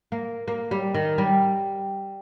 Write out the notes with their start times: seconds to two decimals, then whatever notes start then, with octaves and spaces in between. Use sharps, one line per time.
0.12 A#3
0.48 A#3
0.71 G3
0.94 D#3
1.18 G3